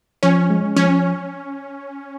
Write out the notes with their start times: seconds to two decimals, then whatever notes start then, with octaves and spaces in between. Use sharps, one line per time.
0.23 F3 C#4
0.50 G#3
0.76 F3 C#4